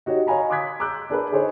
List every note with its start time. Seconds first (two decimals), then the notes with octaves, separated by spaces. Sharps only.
0.06 D#4 F#4 G4 C#5
0.27 C#5 D#5 F5 G#5 A#5 B5
0.50 C6 D6 D#6 F#6 G#6 B6
0.80 A#5 D6 E6 F#6 G6
1.10 D4 G#4 A#4 B4
1.32 D#4 G#4 A4 C5 C#5